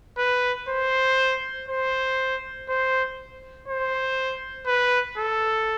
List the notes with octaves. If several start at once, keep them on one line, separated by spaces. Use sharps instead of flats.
B4
C5
C5
C5
C5
B4
A4